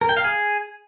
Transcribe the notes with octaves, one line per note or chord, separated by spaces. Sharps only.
A#4
G5
F5
G#4